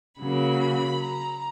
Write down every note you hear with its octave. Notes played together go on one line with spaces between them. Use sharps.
C#3 F#3 A#3 B5
A#5